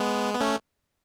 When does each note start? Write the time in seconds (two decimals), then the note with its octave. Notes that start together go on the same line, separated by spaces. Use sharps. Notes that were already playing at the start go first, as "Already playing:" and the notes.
Already playing: G#3 B3
0.34 B3
0.40 A3 C#4